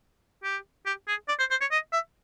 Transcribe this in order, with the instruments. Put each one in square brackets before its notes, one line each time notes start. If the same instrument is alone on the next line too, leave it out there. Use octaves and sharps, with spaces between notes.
[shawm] G4
G4
G#4
D5
C5
C5
C#5
D#5
E5